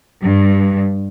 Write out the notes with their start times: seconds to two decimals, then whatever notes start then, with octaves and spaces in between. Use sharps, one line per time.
0.23 G2